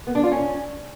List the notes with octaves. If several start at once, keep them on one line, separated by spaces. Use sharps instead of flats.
B3
D4
F4
C#4